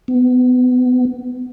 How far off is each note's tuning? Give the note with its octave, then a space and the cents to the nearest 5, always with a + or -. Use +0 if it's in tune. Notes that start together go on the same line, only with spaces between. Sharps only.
B3 +25